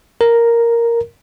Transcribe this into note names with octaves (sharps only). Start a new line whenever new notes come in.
A#4